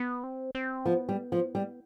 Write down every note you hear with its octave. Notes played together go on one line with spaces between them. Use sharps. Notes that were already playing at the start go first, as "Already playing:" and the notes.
Already playing: B3
C4
C4
F3 B3
G3
F3
G3